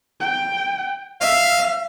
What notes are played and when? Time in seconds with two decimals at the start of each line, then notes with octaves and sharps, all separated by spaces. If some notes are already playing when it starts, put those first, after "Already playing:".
0.20 G5
1.21 E5 F5